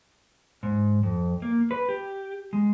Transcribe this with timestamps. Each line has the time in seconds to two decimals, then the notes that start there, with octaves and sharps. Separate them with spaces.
0.63 G#2
1.03 F2
1.42 A#3
1.71 B4
1.89 G4
2.53 G#3